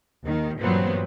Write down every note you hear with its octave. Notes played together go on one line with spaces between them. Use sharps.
D#2 D#3
G2 A#2 E3 F#3 B3 C4